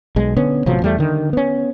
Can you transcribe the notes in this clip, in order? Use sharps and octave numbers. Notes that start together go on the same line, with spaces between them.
B1 G#3
D3 B3 C#4
A1 C3 F3 F#3
E2 G3 A3
D3 D#3
B3 C#4